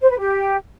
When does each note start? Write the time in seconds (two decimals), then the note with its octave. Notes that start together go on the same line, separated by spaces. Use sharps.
0.01 C5
0.10 B4
0.19 G4